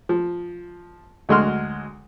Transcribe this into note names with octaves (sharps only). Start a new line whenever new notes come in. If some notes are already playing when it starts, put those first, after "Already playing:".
F3
D2 F#3 G#3 F#4 C6 F6